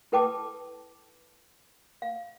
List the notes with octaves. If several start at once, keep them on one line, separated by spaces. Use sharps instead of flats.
E4 A4 B4 G5 A5 D6
F5